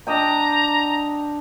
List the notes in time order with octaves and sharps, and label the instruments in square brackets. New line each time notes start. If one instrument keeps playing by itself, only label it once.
[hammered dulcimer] D4 D#5 G5 [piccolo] A#5